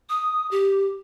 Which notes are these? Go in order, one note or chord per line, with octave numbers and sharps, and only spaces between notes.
D#6
G4